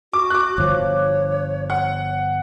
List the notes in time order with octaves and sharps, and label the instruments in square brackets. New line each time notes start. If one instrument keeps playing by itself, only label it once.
[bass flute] F#4 [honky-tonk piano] D6
[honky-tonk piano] D6 F#6
[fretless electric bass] G1 F3 [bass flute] C#5
[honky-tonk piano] F#5